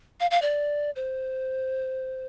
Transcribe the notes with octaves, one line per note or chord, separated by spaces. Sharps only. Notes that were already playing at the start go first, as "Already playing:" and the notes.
F5
F5
D5
C5